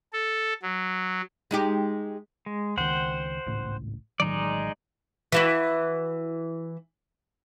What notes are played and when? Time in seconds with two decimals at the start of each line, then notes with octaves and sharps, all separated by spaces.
0.13 A4
0.62 F#3
1.51 G#3 D#4 G4
2.46 G#3
2.77 C#2 D#3 C5 F#5 G5
3.46 G#1 C#2 A2
4.20 A1 D#3 F#3 G#3 D#4 D5
5.32 E3 E4 F#4